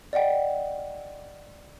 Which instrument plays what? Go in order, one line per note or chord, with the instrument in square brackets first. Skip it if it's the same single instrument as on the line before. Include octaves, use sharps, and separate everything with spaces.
[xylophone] D5 D#5 F#5 G5